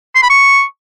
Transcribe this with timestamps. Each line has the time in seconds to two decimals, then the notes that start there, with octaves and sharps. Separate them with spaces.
0.15 C6
0.22 B5
0.30 C#6